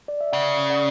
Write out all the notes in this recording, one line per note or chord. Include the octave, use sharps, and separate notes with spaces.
D5
E5
C#3 D5 F#5
D5 F#5